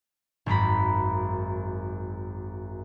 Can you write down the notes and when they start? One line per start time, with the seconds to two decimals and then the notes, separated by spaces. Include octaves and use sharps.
0.46 G#1 F#2 A#5 B5